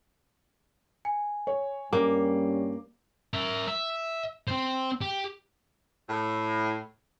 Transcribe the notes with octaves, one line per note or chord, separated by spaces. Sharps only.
G#5
C#5
G2 G3 A#3 C#4 D6
A#4 E5
E5
C4 C5
G4
A2